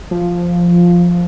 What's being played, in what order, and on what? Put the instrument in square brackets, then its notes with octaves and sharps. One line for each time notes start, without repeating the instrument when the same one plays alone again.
[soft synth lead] F3